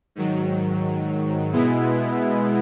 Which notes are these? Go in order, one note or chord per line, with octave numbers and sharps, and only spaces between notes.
G#2 D#3 F#3
B2 G#3 B3 E4